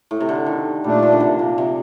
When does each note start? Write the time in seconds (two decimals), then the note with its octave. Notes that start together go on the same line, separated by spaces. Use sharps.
0.11 A2
0.21 C3
0.29 D3
0.46 D#3
0.84 A#2 G3 A3 D4
1.03 F3
1.12 D3
1.20 C3
1.39 A#2
1.58 C3